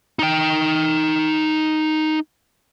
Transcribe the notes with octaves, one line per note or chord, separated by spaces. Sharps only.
D#4 G5